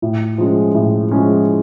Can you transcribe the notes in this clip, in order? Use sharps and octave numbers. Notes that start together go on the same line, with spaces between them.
A2
F3 G#3 C#4
A2
F3 G#3 C#4